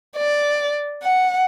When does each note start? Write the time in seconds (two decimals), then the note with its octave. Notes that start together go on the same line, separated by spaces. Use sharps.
0.17 D5
1.03 F#5